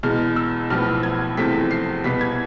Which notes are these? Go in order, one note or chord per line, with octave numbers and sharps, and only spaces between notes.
E2 B2 G#3 F6
E6
B1 A2 F3 B3 F6
G#6
E2 C3 F3 A3 C4 B6
C7
C2 B2 B3 B6
G#6